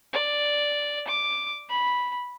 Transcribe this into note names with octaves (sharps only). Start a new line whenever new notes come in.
D5
D6
B5